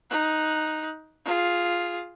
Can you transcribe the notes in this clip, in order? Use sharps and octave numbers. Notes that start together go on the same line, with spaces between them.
D#4 F#6
F4 G#4